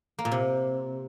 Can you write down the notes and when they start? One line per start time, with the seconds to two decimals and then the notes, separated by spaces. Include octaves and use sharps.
0.19 A#3
0.25 A#2
0.31 C3